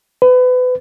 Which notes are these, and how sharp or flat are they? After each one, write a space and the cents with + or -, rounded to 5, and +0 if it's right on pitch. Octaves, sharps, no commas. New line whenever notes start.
B4 +30